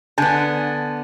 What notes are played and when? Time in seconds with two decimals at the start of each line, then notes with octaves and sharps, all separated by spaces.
0.18 D3 B3 G#5 A5 G6